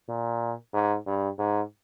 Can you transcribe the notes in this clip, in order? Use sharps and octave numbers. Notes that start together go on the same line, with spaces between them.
A#2
G#2
G2
G#2